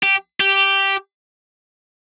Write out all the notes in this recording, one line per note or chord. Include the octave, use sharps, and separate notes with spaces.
G4
G4